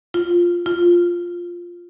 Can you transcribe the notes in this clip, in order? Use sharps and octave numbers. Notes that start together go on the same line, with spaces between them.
F4
F4